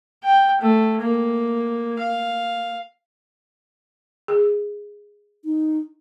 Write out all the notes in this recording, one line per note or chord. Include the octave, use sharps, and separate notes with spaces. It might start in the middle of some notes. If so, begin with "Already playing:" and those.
G5
A3
A#3
F5
G#4
D#4